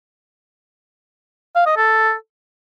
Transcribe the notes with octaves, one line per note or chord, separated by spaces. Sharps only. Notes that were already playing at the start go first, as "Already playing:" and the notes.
F5
D#5
A4